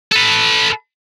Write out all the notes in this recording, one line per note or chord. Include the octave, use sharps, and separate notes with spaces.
A4 B4